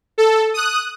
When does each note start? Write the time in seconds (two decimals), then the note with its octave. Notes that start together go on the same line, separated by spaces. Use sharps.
0.18 A4
0.54 D#6 F#6